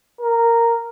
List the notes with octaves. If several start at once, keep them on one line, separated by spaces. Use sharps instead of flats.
A#4